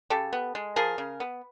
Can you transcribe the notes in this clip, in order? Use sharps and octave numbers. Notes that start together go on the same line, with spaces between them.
C#3 G4 A4
B3
G#3
F3 G#4 A#4
C#3
B3